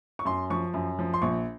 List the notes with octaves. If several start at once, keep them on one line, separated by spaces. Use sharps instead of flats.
C#6
F#2 C6
F3 C#6
F#2
F3
C6
A#1 C#6